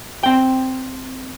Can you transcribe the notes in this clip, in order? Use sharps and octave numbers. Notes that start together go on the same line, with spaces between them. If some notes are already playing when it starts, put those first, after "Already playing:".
C4 G5